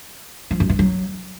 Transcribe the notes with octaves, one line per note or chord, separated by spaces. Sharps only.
F3
F#2
E3
F#3